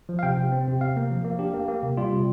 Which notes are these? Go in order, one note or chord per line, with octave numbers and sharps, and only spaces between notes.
F3
F5
C3 G5
C3
C4
C3
C3 F5
A#3
F3
A#3
D4 G4
A#3
A#3
C3
G3 F4
C3